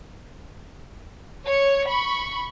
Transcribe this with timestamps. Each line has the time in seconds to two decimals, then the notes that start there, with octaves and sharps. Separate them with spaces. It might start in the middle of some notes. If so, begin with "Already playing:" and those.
1.47 C#5 C#7
1.88 B5 C#6